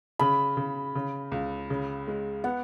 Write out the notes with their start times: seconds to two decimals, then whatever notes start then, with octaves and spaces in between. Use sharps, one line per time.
0.19 C#3 B5
0.57 C#3
0.95 C#3
1.32 C#2
1.70 C#3
2.08 G#3
2.44 B3 F#5